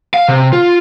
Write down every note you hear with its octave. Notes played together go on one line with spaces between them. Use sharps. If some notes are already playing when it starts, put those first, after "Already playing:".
F5
C3
F4